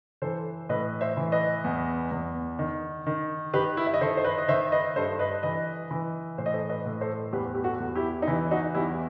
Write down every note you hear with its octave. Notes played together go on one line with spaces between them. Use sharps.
E3 A4 C5
A2 B4 D#5
C5 E5
E3
B4 D#5
E2
E2
D#3
D#3
D#3 G4 B4
E4
E5
D#5
D#3 A4 C5
C5
B4 D#5
D#5
D#3 C5 E5
B4 D#5
G2 A4 C5
B4 D#5
E3 B4 D#5
E3
A2 C5
D#5
A4 C5
B4 D#5
A2
A4 C5
E2 G4 B4
G4
F#4 A4
E2
E4 G4
D#4
E3 E4
D#4 F#4
E2 E4 G4